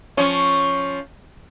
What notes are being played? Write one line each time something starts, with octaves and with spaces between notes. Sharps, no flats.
F3 C#4